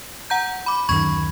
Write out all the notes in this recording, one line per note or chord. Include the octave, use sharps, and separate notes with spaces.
F#5 A#5 G6
B5 D6
D1 F#2 D#3 B5 C#6 G#6